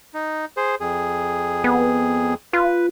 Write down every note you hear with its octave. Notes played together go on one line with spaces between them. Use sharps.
D#4
G#4 C5
F2 G#4
B3
F4 B4